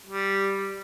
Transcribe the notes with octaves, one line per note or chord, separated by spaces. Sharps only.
G3